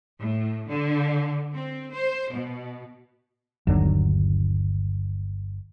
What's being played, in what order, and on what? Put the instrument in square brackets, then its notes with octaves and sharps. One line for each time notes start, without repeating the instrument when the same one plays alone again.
[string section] A2
D3
C4
C5
B2
[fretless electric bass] G1 D#2 D3 F#3